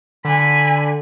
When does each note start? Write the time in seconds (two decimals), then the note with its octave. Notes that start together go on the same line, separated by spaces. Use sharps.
0.25 D3 G#5 B5